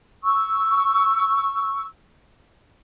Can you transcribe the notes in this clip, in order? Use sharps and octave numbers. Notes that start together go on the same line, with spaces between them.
C#6 E6